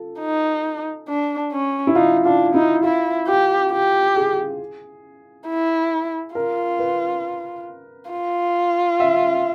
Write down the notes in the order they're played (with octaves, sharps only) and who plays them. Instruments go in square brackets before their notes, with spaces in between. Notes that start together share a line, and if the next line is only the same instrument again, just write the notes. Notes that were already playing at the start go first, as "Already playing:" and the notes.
Already playing: [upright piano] F4 A4
[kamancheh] D#4
D4
C#4
[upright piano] E4
[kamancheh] D#4 [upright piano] F4
[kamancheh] D4 [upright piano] F4
[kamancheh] D#4 [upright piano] E4
[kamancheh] E4 [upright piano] F4
[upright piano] F4 [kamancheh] G4
[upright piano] F4 [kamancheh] G4
[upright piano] G#4
[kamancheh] E4
[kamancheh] F4 [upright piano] A#4
[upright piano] B4
[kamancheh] F4
[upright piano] E5